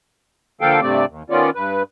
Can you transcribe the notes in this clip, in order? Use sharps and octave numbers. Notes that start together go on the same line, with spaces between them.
D3 F3 A#3 A4 F5 G5
G2 C3 A3 C4 D5
D#2
D#3 B3 C#4 F4 D5
G2 B4